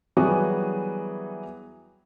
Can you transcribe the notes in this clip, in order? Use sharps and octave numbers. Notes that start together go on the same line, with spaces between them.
E3 F#3 G3 B3 F#4 G#4